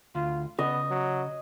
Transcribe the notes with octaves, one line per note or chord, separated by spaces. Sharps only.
D2 F4
C#3 B3 D#5
F#3